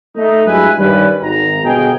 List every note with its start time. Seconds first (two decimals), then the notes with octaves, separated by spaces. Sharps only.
0.16 A3 D#4
0.46 G2 F#3 G#3 E4 B4 G#5
0.78 G2 D#3 G3 C#4 B4
1.20 G#1 A#5
1.63 G1 B2 B3 G#4 G5